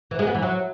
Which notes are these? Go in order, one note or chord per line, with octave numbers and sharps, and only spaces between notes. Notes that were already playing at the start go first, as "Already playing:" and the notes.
E3
G#3
B3
E3
F#3